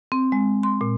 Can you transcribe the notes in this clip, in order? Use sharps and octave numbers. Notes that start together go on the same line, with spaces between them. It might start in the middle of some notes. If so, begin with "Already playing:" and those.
C4
G#3
C6
A#2